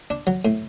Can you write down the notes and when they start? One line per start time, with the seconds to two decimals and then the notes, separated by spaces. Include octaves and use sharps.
0.10 D4
0.27 F#3
0.45 A2